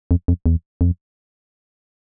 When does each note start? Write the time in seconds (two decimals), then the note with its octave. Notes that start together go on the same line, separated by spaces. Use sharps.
0.11 F2
0.28 F2
0.46 E2
0.81 F2